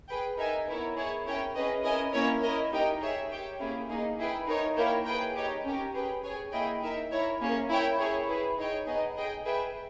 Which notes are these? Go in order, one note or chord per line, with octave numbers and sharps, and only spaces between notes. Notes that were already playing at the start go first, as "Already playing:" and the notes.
G#4 B4 G5
D#4 A#4 E5 G#5
B3 E4 A#4 C#5
E4 G#4 C#5
C#4 E4 A#4 C#5 G5
C#4 G#4 B4 D#5
C#4 E4 A#4 D#5 G#5
A#3 C#4 E4 A#4 C#5
E4 A#4 D#5
D#4 G4 A#4 D#5 G5
G#4 C#5 E5
G4 C#5 G5
A#3 C#4 E4 G#4
A#3 D#4 G#4
E4 G#4 B4 G5
D#4 A#4 C#5
A#3 E4 A#4 C#5 G5
G#4 B4 G5
D#4 G4 C#5
C#4 G4 A#4
G#4 B4 G5
G#4 C#5 G#5
A#3 E4 G#4 D#5 G5
D#4 A#4 E5
E4 A#4 C#5
A#3 C#4 G#4 C#5
E4 A#4 C#5 G5
E4 G#4 C#5
E4 G#4 B4
D#4 G#4 C#5 G5
B3 D#4 G#4 B4 D#5
G#4 D#5 G5
G#4 B4 E5 G5